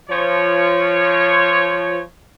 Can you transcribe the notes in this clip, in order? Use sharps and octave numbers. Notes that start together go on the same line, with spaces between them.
F3 C#5